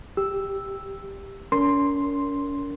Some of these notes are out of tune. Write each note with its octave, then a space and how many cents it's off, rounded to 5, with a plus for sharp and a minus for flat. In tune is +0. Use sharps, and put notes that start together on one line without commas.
G4 +5 E6 +0
C#4 +40 A#4 +0 C6 +0